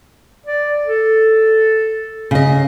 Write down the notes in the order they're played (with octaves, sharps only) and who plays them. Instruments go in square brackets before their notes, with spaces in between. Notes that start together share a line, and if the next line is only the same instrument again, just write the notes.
[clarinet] D5
A4
[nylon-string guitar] C#3 D#5